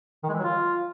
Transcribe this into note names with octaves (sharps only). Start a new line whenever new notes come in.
D#3
G#3
E3
F#3
F4